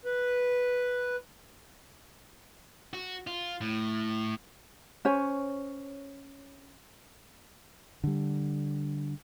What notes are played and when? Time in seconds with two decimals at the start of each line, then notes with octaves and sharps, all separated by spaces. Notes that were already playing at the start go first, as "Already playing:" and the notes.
0.05 B4
2.93 F#4
3.27 F4
3.61 A2
5.05 C#4 C5 C#5 G#5
8.04 D3 G3